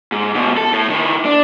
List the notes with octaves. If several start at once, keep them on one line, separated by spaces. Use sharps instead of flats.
G#2
D2 B2
A4
A2
D#3 E3
D4